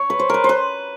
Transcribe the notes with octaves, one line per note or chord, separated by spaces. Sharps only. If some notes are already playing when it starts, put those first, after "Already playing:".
Already playing: C#5
B4
C5
A#4 B4
C5
B4